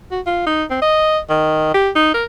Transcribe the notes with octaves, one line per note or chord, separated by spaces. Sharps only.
F#4
F4
D#4
C4
D#5
D#3
G4
D#4
A#4